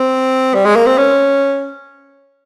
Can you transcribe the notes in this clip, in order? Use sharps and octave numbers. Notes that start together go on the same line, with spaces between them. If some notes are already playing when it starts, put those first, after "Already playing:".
Already playing: C4
G3
G#3
A#3
C4
C#4